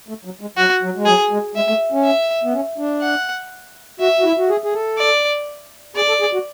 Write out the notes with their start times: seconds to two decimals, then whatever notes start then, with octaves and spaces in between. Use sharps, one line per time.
0.08 A3
0.25 F#3
0.41 G#3
0.57 F#3 F#4
0.82 F#3
0.96 G#3
1.06 F#3 G#4
1.31 G#3
1.55 G#3 E5
1.68 A3
1.92 C#4
2.04 E5
2.44 B3
2.53 C#4
2.78 D4
3.02 F#5
4.00 F#4 E5
4.20 F#4
4.25 E4
4.38 F#4
4.49 G#4
4.64 G#4
4.73 A4
4.98 D5
5.96 G#4 D5
6.08 A4
6.21 G#4
6.33 F#4